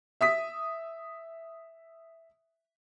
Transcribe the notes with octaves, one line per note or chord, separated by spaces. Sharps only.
E5 D#6 B6